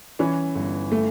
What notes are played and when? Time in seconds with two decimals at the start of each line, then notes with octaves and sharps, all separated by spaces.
0.19 E3 C#4
0.55 G1
0.92 A3